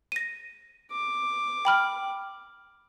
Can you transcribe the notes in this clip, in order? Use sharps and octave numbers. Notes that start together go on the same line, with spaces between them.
A#6 D#7
D6
G5 B5 F6